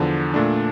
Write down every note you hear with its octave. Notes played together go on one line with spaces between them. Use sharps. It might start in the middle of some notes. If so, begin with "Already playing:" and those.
Already playing: E2 D3 F3
A#2 A3 D4